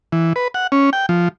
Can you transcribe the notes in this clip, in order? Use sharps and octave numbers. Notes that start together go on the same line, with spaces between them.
E3
B4
F#5
C#4
G5
F3